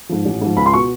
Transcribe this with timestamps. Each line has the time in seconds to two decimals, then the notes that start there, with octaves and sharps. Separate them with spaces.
0.09 G#2 F3
0.25 A1
0.41 G#2 F3
0.57 C#2 B5
0.66 C6
0.73 B2 C#6